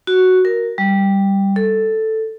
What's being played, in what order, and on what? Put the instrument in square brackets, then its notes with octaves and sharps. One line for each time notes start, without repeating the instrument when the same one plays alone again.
[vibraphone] F#4
A#4
G3
A4